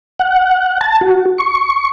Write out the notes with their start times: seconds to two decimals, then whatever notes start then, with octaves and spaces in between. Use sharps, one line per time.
0.19 F#5
0.81 A5
1.01 F#4
1.38 C#6